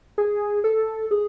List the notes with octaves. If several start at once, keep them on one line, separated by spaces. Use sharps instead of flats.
G#4
A4
G#4